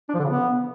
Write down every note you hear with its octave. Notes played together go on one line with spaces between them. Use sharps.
D4
F3
D3
C#3
B3